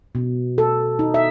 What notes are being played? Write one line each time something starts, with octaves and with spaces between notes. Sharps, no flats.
B2
A4
D#4
E5